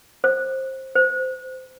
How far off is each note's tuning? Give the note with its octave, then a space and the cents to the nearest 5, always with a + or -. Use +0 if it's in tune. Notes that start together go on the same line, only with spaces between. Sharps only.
C5 +20
C5 -25